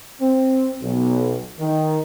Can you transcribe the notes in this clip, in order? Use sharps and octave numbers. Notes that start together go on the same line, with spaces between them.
C4
B1
D#3